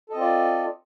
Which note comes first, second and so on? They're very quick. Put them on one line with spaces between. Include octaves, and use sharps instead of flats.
A4 D#5 C4 F4 D5